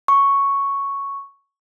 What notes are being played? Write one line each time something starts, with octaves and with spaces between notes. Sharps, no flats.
C#6